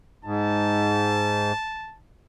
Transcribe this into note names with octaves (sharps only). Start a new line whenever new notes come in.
G#2 A5